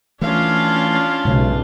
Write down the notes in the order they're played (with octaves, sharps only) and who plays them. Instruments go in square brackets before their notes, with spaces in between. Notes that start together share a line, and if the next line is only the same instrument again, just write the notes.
[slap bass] E3 A3 [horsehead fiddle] C#4 F5 [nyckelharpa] D4 F4
[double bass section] B1 C#3 [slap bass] G#2